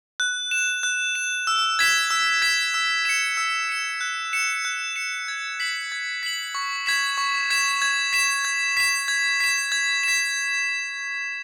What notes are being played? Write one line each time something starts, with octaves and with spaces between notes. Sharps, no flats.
F#6
E7
F#6
E7
E6
G#6 B6 E7
E6
G#6 B6 E7
E6
C#7 E7
E6
C#7 E7
F#6
C#7 E7
F#6
C#7 E7
G#6
B6 F#7
G#6
B6 F#7
C#6
G#6 B6 E7
C#6
G#6 B6 E7
G#6
B6 E7
G#6
B6 E7
G#6
B6 E7
G#6
B6 E7